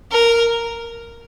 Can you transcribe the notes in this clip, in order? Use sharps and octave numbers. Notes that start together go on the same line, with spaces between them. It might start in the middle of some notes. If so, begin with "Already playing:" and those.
A#4